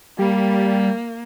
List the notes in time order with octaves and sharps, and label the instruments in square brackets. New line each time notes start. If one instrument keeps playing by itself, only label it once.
[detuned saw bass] G3 [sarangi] A#3